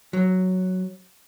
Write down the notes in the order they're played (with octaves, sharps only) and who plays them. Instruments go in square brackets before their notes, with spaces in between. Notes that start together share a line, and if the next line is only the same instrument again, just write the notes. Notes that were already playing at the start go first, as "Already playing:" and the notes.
[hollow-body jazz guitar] F#3